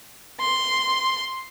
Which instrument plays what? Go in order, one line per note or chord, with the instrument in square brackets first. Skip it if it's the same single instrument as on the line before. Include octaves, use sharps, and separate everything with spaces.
[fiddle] C6